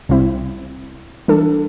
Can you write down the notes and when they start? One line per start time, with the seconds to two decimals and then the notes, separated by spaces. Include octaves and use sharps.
0.09 C2 C3 G3 C4 E4
1.28 E3 G3 D4 A4